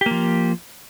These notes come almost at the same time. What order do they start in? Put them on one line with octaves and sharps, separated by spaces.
G4 A#3 F3